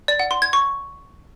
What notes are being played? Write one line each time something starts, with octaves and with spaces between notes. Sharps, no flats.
D5
F#5
C6
G#6
C#6